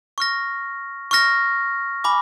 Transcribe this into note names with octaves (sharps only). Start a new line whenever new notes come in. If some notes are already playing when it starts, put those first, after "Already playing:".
C#6 F6 A#6
C#6 F6 A#6
G#5 B5 D6